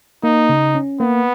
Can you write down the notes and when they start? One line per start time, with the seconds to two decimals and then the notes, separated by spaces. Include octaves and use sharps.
0.24 A#3 D#4
0.49 C#3
0.75 C#4
1.00 A#3 B3